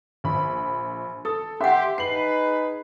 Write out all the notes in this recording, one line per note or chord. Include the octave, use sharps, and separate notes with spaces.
A#1 B5
A4 D#6
C#4 G4 E5 F#5 C6
D#4 G#4 B4 C7 F#7